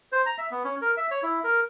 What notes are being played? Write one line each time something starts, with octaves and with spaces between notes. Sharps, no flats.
C5
A#5
E5
B3
C#4
A#4
E5
C#5
E4
A#4